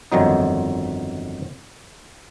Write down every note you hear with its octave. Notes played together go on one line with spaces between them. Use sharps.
G1 F2 D#3 F#3 D#4